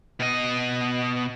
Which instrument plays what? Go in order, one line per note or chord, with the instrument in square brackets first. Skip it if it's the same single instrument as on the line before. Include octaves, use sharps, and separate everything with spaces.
[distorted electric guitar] B2 D#5